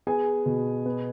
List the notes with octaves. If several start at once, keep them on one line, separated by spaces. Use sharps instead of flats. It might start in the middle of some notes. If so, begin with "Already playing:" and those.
B3 G#4 G#5
B2
B3